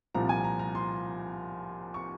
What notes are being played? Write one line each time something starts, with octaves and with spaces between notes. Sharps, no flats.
C2 A#2 F3 A#5
G#5
A#5
A#5
C6
C#6